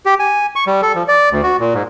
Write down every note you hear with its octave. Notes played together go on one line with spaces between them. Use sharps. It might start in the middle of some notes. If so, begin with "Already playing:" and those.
G4
G#5
C#6
G3
A4
F3
D5
D2
F#4
A#2
G#2